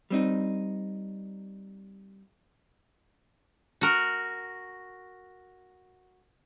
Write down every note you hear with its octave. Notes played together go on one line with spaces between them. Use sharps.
G3 C4 D#4
F#4 A#4